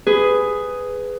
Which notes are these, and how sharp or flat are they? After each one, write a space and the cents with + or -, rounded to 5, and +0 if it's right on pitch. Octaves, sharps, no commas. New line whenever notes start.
G#4 +0 B4 +15